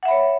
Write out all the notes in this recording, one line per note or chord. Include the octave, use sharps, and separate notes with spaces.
C#5 E5 F#5 B5